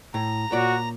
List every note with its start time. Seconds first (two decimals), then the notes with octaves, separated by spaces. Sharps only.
0.14 A2 A#5
0.52 A#2 F#4 C#5 D5